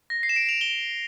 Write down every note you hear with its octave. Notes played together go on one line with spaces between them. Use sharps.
A#6
C7
E7
D7
F7
G7